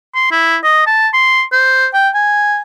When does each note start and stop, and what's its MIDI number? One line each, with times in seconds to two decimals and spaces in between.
0.15 0.29 84
0.31 0.58 64
0.64 0.85 75
0.86 1.08 81
1.14 1.43 84
1.52 1.87 72
1.93 2.09 79
2.14 2.62 80